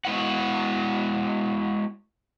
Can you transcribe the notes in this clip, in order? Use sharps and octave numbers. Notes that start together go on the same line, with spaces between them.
G#3 B3 E4 F#4 F#5